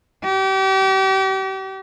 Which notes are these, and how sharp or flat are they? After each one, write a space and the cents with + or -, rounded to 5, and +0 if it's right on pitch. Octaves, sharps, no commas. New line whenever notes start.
G4 -35